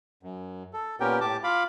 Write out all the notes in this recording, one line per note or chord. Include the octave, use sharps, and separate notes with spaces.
F#2
A4
A#2 B3 C#4 G4 A#4 G5
A2 G4 A5 D6
F4 F5 B5 D6